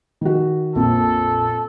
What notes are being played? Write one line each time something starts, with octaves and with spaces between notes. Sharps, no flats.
D#3 F#4
A#1 F2 A#2 A4